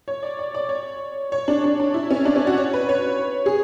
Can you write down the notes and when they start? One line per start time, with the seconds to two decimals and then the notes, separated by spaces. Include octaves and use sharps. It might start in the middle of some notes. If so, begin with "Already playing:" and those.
0.08 C#5
0.23 D5
0.39 D5
0.54 D5
0.69 C#5
1.32 C#5
1.48 D4
1.64 D4
1.80 D4
1.94 E4
2.11 C#4
2.25 D4
2.36 C#4
2.47 F#4
2.58 C#5
2.73 B4
2.89 C#5
3.46 G#4